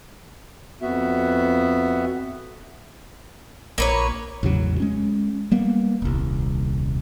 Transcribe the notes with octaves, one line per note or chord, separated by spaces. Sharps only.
F2 B3 F#4 E5
A#1 A#3 B4 C#5
A1 E2 C#3 F#3
G#3 C#4
G3 A#3 B3
D#1 C2